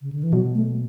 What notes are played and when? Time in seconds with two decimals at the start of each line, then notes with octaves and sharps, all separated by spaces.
0.02 C#3
0.13 D3
0.23 E3
0.33 B2 F#3
0.55 A3